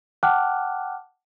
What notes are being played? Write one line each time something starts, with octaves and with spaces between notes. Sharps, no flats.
F#5 G5 A5 D6 F6 F#6